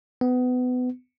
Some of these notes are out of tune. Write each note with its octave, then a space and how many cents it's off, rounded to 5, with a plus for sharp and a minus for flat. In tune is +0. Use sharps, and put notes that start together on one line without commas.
B3 +25